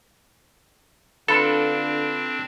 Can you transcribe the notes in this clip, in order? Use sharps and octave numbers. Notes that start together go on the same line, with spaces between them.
D3 C4 D4 F4 A4 B4